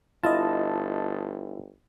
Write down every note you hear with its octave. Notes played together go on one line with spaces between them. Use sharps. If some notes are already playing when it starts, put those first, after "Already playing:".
G1 E4 F4 D#5 A5